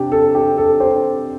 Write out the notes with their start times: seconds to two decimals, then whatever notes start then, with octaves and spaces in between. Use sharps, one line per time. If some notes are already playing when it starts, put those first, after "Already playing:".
Already playing: C3 D4 G4
0.12 A4
0.35 G4
0.58 A4
0.80 G4 C5